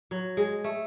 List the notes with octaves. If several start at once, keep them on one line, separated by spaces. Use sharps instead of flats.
F#3
G#3
A3